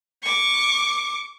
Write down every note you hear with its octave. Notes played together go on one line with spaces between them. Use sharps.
C#6 D6